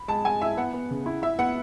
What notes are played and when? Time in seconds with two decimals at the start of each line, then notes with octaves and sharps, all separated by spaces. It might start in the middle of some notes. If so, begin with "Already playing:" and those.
Already playing: B5
0.08 G#3 A5
0.25 G#3 G#5
0.41 E4 E5
0.57 B3 F#5
0.73 B3
0.91 C#3
1.06 E4
1.22 E4 E5
1.39 B3 F#5